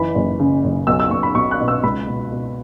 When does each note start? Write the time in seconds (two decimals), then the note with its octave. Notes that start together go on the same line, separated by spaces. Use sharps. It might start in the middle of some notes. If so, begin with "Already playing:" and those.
Already playing: F#1 E3 B5
0.15 F#1
0.40 C#3
0.64 F#1
0.87 B1 E6
1.00 E6
1.11 B1 C#6
1.23 B5
1.35 B1 C#6
1.51 F#6
1.60 B2
1.68 E6
1.83 C#2 B5
2.07 B2
2.32 B2